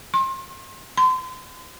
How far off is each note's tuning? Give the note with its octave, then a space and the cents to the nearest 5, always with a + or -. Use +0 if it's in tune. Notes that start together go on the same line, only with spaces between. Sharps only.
C6 +30
C6 -35